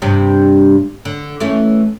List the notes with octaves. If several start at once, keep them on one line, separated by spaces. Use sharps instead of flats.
G2 C3 G3
D3
E3 A3 C#4